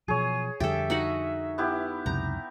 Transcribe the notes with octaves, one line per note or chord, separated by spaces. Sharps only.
B2 F3 F#3 G#4 C#5 D#7
F2 D3 G3 G4 A4 E5
D#4 F#4 F#5
B3 E4 G4
C#2 F#2 C3 A#5 G6